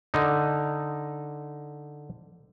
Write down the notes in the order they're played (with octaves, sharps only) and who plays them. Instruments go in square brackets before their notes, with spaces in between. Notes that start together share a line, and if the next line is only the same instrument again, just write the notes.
[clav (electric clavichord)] D3 D#4